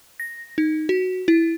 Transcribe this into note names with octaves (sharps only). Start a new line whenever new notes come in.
A#6
D#4
F#4
E4